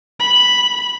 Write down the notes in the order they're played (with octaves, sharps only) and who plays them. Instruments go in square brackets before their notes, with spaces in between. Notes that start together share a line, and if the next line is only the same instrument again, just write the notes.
[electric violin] B5